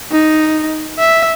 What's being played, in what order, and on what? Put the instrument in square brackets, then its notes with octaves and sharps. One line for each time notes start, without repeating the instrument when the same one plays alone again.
[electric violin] D#4
E5